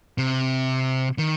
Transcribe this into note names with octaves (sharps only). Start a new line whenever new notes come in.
C3
D#3